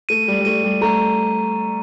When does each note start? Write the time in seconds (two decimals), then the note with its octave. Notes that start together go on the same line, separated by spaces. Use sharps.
0.09 A3 D#7
0.28 G3
0.41 G3
0.45 A3 D#7
0.64 G3
0.81 A3 A#5